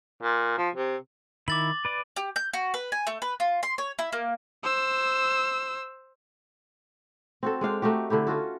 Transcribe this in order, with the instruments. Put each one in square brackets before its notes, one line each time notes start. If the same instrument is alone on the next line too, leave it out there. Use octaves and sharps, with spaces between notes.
[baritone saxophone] A#2
F3
C3
[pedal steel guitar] D#3 E4 B5 [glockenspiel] D6 A6 F#7
[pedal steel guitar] B4 D5
[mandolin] G4
G6
F#4
B4
G#5
A3
B4
F4
C6
C#5
E4
A#3
[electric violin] C5 E6
[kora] C4 F#4 A4
G#3 D4 F5 G5
A3 D#4 F#4 G4
D3 A3 E4 G4
C#4 F4 F#4 A4